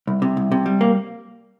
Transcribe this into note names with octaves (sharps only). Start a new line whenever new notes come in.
C2
C3
C2
C3
G3
A#3